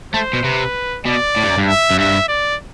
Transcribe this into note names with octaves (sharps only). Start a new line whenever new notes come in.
A3 C5
B2
C3 B4
B2 D5
A2
G2
F#2
G2
E5
F#2
G2 E5
D5